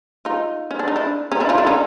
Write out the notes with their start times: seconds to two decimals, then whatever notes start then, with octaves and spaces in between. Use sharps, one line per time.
0.25 D#4 F4
0.71 C#4
0.79 D4
0.88 D#4
0.96 D4 E4
1.32 C#4 D#4
1.40 D4 E4
1.49 D#4 F4
1.58 D4 E4
1.66 C#4 D#4